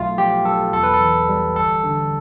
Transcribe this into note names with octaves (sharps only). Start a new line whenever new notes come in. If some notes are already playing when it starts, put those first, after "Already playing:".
Already playing: B1 A3 F4
F3 G4
B1 A4
E2 A4
B4
A4
E3
G3
G1 A4
D3